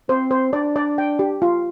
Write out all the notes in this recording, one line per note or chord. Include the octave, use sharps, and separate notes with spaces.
C4 C5
C5
D4 D5
D5
G5
G4
F4